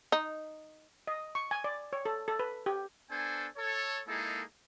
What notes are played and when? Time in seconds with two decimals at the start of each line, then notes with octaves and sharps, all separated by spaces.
0.12 D#4
1.07 D#5
1.35 C#6
1.51 G#5
1.64 D5
1.93 C#5
2.06 A4
2.28 A4
2.39 B4
2.66 G4
3.11 B3 D4 A4 C5 G#5
3.58 A4 C#5
4.08 G#3 A#3 D#4 E4 G#4 A4